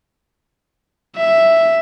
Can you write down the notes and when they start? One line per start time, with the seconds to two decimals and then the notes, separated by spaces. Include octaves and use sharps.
1.16 E5